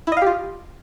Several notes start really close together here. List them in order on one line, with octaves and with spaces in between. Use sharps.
E4 D#5 F5 G4 F4